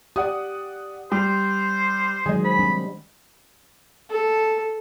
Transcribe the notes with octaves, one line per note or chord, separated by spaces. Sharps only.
G4 D5 F#5 D#6
G3 C5
D#3 F#3 G#3 G#4 D#5
C5 B5
G3 C4 D4
A4